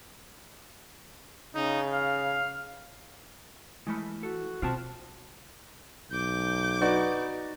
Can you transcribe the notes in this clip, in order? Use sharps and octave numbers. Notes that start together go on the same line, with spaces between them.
C#3 D#4
F5
E3 G#3 A3 B5
F#4 A4
B2 C4 F4 G5 A5
B1 D6 G6
D#4 F#4 B4 D5